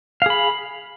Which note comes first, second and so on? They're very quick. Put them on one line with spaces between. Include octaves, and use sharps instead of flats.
F5 G#4 B5